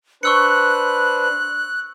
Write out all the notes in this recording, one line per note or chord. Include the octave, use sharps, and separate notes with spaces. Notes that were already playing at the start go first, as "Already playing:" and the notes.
D4 B4 C5 C#6 E6 F#6 C#7